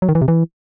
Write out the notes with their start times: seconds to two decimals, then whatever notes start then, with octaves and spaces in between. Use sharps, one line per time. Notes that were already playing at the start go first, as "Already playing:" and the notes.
0.02 F#3
0.09 D#3
0.15 E3
0.22 C3
0.28 E3